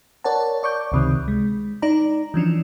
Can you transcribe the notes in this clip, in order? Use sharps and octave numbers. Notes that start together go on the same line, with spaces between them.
A#4 C#5 D5 F#5 A5
D5 C#6 D6 G6
C#2 C3 D#3
G#3
D#4 D5 A#5
E3 F3 C#4 D4